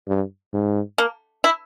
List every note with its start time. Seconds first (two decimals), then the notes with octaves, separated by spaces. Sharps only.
0.08 G2
0.53 G#2
0.98 A#3
1.44 E4